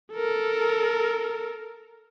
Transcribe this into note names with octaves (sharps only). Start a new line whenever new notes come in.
A4 A#4